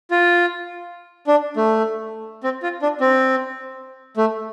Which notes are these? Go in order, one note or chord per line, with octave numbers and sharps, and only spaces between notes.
F4
D4
A3
C4
F4
D4
C4
A3